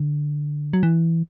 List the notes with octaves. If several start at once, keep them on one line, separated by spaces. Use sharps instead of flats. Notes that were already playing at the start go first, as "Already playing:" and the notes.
Already playing: D3
F#3
E3